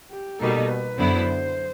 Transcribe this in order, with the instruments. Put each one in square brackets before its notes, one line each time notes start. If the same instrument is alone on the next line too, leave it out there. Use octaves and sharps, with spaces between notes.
[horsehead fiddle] G4
[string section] B2 G3 A#3 D#4 [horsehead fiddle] A4
[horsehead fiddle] B4
[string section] F#2 D3 F#3 B3 E4 [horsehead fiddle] C5